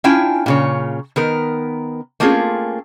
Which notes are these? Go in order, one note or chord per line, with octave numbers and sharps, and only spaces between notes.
C#4 D4 E4 F4 G5 G#5
A#2 C#3 C#5
D#3 B3 A#4
A3 A#3 C4 C#4 F4 G#4